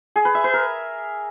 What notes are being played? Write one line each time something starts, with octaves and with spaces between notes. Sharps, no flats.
G#4
B4
E5
B4
A#4